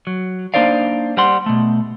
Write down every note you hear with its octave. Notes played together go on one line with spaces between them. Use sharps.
F#3
A#3 D4 D#4 C5 D5 F5
G3 C5 F#5 C6
B2 A3